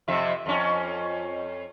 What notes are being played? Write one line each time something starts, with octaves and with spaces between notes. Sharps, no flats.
F2 C3 E5
F2 C#4